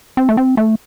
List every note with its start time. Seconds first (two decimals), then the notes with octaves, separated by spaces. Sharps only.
0.17 C4
0.29 A3
0.37 C4
0.57 A3